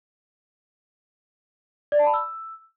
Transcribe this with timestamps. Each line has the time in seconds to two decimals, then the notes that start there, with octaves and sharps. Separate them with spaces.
1.92 D5
1.99 A5
2.06 B5
2.14 E6